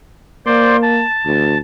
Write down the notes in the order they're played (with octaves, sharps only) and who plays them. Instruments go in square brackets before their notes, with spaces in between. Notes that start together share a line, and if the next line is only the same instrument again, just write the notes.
[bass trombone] A#3 [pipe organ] C5 D5 C6
[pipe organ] A5
[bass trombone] D2